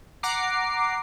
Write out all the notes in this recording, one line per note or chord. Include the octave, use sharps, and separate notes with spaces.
F#5 A#5 D6 C7